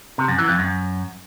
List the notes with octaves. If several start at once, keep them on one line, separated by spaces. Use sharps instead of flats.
C3
F#2
E3
F2
F#2